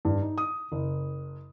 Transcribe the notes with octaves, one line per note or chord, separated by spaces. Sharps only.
G2
D#4
D#6
F#1